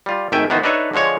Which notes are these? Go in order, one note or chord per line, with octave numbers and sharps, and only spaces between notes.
G3 F4
G#1 D#3 A3 E5 G5 G#5
D#3 E3 B3 F#4 C5
D4 D#4 A4 B4 C#5 E5
D3 F3 G#3 C#5